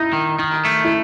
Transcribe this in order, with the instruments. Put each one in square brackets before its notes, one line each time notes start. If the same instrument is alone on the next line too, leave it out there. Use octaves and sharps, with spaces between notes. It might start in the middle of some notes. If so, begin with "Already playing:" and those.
Already playing: [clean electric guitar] D#4 [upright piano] E4
[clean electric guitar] D#3
D#3
A3
[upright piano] E4